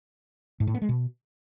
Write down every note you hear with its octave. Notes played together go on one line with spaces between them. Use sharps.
G#2
A2
B3
G#3
B2